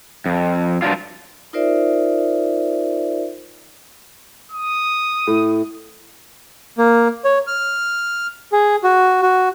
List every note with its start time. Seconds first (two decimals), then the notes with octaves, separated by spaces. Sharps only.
0.26 F2
0.82 G2 F3 F#3 D4 F4
1.53 D#4 F4 A#4 C5 D5 E5
4.52 D#6
5.27 A2
6.78 A#3
7.25 C#5
7.47 F6
8.52 G#4
8.84 F#4
9.22 F#4